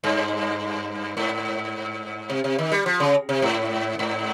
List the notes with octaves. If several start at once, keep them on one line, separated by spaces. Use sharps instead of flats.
G2
G#2
C3
C3
D#3
G3
F3
C#3
C3
G#2
G#2